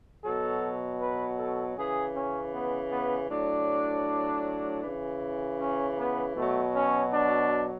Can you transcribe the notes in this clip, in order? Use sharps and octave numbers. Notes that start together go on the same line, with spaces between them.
B2 F#3 A4
B4
A4
C#3 E3 G#4
C#4
B3
B3
A2 F#3 D4
C#3 E3
C#4
B3
B2 F#3 A3
C#4
D4